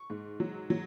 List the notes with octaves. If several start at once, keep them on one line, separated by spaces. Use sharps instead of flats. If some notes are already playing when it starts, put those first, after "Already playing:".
Already playing: C#6
G#2
F#3
F#3